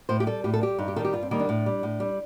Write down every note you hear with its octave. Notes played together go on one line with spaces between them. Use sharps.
A2 C5
G4
G3 A4
A2 G4
A4
G3 G4
G2 D#4
G4
D#3 G3 A4
G4
G2 F4
C4
D#3 G3 A#3
D4
A2
G3
A2
G3